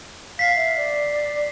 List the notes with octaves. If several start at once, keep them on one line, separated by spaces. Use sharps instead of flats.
F5 B6 C7
E5
D5